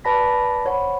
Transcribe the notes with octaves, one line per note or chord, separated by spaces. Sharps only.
B4 D5 A5 B5 A#6 B6
C5 C#5 F#5 B5